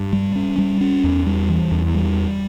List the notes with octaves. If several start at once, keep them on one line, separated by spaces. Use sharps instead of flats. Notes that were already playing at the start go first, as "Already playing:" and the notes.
Already playing: G2
G3
C#4
G3
C#4
E2
G3
E3
E2
G3